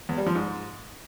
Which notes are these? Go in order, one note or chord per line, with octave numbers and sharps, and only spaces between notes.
E2
G3
F3
G#2